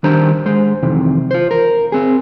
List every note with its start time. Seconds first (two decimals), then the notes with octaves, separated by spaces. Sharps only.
0.04 D#3 G3 D4 C5 A#5
0.46 G#3 C5
0.83 F2 C3 D#3 E3
1.31 F4 C5
1.51 A#4
1.92 C4 G#4